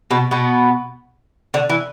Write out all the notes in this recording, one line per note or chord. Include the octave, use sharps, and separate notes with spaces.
B2 B3
B2 B3
D3
E3